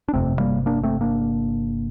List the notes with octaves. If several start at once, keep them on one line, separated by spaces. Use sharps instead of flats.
D4
G1 F2 C3 A3 C4
G3 A#3
A#3 D4
A3 C4
A#3 D4